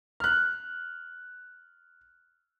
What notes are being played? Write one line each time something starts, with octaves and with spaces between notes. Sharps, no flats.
F6 F#6